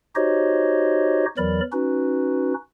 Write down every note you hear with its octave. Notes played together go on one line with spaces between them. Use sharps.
D#4 F#4 G4 C5 C#5 D#5
E2 E3 F#3 A#4 D5 B5
C#4 D#4 F#4 B4